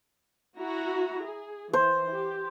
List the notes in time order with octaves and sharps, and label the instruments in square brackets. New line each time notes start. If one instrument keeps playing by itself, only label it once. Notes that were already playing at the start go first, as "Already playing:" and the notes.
[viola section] E4 F#4 A#5
G#4
[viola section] E3 [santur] C5
[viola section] G4